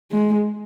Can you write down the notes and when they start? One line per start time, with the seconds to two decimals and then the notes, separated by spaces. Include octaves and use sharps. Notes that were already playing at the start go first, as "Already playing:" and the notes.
0.12 G#3